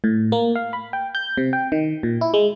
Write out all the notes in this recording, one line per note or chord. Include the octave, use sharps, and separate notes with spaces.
A2
A#3
F5
B5
G5
G6
C3
G5
D#3
A#2
E4
G#3